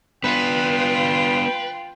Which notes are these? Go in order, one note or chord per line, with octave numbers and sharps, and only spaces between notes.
B3 D4 F4 B4 G5